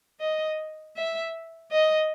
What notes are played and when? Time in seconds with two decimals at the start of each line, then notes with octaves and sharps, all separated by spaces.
0.21 D#5
0.97 E5
1.72 D#5